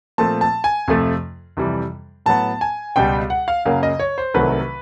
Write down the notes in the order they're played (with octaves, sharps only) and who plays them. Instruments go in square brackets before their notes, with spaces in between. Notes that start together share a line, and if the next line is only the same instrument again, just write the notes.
[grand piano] A#2 F3 A3 C4 A5
A5
G#5
F2 C3 F3 A3
F2 C3 E3 G3
A2 F#3 B3 A5
G#5
C#2 B2 G3 G5
F#5
F5
F#2 C#3 F#3 A#3 F5
D#5
C#5
C5
C2 C3 D#3 F#3 A3 B4